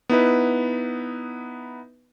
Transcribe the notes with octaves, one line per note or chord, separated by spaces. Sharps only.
B3 D#4 E4 B4